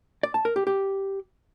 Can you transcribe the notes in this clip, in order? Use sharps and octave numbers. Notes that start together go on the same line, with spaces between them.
D5
A5
A#4
G4
G4